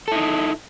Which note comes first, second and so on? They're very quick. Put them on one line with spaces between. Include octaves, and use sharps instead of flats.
A4 E4 D#4